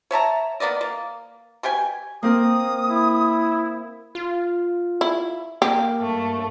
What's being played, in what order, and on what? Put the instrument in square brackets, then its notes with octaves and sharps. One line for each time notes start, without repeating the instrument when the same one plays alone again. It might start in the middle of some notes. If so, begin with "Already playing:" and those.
[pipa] C#5 E5 A5 A#5
A#3 B3 D5 D#5
A#3
B2 G4 G5 G#5
[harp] A#3 C4 A#4 [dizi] D#6
[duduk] E4
[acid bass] F4
[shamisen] E4
[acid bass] A#3 [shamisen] G4
[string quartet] G2 A3